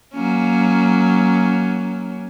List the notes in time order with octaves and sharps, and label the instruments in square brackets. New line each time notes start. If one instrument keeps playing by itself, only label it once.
[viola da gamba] F#3 A#3 C#4